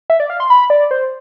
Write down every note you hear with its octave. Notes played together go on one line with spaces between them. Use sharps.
E5
D5
F5
C6
B5
D5
C5